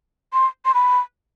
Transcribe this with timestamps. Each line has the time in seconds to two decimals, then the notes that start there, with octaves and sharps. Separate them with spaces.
0.33 C6
0.65 C6
0.74 B5